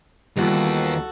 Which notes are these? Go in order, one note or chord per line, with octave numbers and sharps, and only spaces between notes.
D#2 E3 G3 B3 F4 F#4 A4